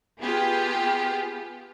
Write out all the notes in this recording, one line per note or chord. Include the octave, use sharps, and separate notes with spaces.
B3 F4 G4 G#4